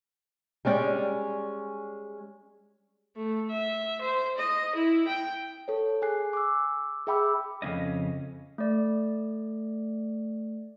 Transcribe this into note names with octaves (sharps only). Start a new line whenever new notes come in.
G3 G#3 C#4 D5 G5
A3
E5
C5
D#5
E4
G5
A4 C#5
G#4 G#5 F#6 C7
D6 E6
G#4 E5 G5 B5 D6 E6
F2 C#3 C4 C#4 D#5
A3 D5